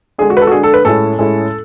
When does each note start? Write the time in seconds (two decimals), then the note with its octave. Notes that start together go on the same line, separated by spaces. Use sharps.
0.18 D3 G#3 D4 G#4
0.30 F#4
0.37 B4
0.42 A4
0.47 F#4
0.51 D3 G#3 D4 G#4
0.63 A4
0.74 B4
0.85 A2 G#3 C#4 E4 A4
1.19 A2 G#3 C#4 E4